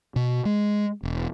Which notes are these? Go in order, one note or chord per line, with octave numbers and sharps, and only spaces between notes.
B2
G#3
E1